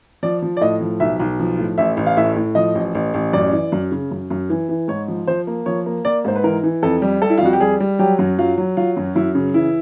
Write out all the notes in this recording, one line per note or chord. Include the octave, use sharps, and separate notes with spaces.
F3 D5
F3
D5
A2 D#5
F3
B1 E5
B1
F3
A2
A1 E5
A1
F5
A2 E5
A2
F3 D#5
A1
A1
A1
F#2 D5
E3
F#2
C#3
F#2
F#2
E3
E3
G#2 C#5
F3
F3 C5
A#3
F3 C#5
A#3
A#3 D5
G#2 C5
B4
E3 A#4
E3
F2 A4
G3
G3 A4
E4
F4
F2 F#4
G4
G3 G#4
G3
F#3 G4
F#2
F#3 F4
F#3
F#3 F4
F#2
F#2 E4
C#3
E3 E4